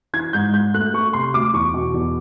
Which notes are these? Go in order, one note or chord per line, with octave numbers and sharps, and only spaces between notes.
E3 G#6
G#2 G6
G#2 G6
A3 F#6
A3 C#6
C3 C6
D2 D6
E2 C#6
B2
E2